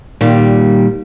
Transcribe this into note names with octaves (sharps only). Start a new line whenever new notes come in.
A#2 D#3 G3